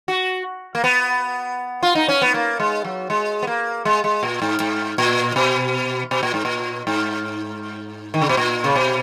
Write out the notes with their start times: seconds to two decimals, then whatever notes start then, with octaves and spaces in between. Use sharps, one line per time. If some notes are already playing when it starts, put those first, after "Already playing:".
0.08 F#4
0.75 A#3
0.84 B3
1.83 F4
1.95 D#4
2.08 C#4
2.22 B3
2.34 A#3
2.60 G#3
2.84 F#3
3.10 G#3
3.43 B3
3.47 A#3
3.85 G#3
4.04 G#3
4.23 A#2
4.42 G#2
4.60 G#2
4.98 A#2
5.36 B2
6.11 B2
6.23 A#2
6.34 G#2
6.45 A#2
6.87 G#2
8.14 D#3
8.22 C#3
8.29 B2
8.37 A#2
8.64 C#3
8.76 B2